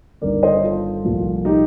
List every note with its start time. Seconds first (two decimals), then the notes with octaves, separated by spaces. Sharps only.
0.21 G1 G2 D#3 A#4 D5
0.43 C5 D#5
0.63 F4 A4
1.05 C2 A#2 F3
1.45 D#4 G4